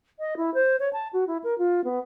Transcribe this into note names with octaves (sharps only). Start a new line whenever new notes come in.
D#5
E4
C5
C#5
A5
F#4
E4
A#4
F4
B3